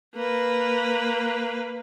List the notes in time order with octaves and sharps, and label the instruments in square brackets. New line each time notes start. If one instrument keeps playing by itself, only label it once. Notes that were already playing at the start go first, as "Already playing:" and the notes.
[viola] A#3 B4